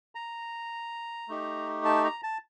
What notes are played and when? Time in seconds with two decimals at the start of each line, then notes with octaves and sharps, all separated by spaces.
0.15 A#5
1.28 A3 D#4 G4
1.85 A5
2.04 A#5
2.23 A5